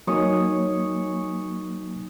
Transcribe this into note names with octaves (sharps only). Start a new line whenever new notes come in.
F#3 A#3 D#4 C#5 G#5 D#6